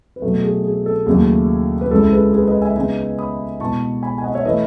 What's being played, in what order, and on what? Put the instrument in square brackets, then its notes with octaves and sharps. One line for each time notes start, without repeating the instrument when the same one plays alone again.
[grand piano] B4
B2 F#3 A3 A4
G#4
G#4
A4
D#2 C#3 F#3 A3 E4 G#4
B4
C#2 C#3 G#3 C#4 E4 A4
G#4 B4
G#4 B4
B4 D#5
E5 G#5
C#3 G#3 B3 D#4 E5 G#5
B5 D#6
B2 G#3 B3 E4 A5 C#6
G#5 B5
G#5
D#5 F#5
C#5 E5
E3 A3 E4 B4 D#5